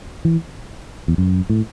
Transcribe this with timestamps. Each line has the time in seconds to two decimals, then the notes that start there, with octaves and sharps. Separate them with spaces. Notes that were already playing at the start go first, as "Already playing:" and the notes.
0.25 E3
1.08 E2
1.18 F#2
1.49 A2